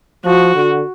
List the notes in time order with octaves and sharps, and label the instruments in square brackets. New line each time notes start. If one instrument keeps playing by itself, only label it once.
[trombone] F3 [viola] F#4
[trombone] D3